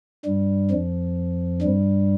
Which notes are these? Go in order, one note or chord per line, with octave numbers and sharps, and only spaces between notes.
G2 G3
F2 F3
G2 G3